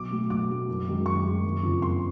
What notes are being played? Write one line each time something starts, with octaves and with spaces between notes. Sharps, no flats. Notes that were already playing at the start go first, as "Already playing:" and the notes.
Already playing: B1 D6
A2 F#3 A3
B1 D6
A2 F#3 A3
F#1
F#2 D#3 G#3
F#1 C#6
F#2 D#3 G#3
F#1
F2 C#3
F#1 C6